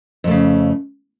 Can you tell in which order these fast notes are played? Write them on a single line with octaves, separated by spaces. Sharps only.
F2 A3 C#3